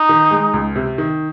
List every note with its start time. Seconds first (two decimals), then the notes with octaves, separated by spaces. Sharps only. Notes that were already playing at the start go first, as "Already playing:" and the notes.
Already playing: D#4
0.09 D#3
0.31 G#3
0.54 C#2
0.76 C3
0.98 D#3